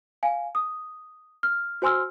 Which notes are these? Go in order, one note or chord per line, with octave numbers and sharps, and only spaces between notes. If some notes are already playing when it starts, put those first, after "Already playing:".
F5 G#5
D#6
F6
F#4 C5 G#5 C6 E6 F6